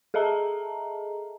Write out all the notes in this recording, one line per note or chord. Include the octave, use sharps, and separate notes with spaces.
G#4 A4 D#5 E5 A5 A#5